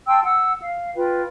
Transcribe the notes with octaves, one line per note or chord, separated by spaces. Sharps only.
G5 A5 C6 E6
F#5 E6
F5
F4 B4 G5